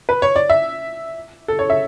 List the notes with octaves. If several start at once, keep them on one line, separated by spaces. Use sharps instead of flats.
B4
C#5
D5
E5
A4
C#5
E5